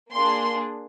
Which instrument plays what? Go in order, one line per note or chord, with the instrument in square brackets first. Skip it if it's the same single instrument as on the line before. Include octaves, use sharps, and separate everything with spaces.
[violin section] A#3 D4 G#4 C6